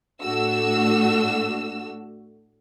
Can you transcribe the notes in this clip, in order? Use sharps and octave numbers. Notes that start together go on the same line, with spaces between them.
A2 A3 D4 F#4 E6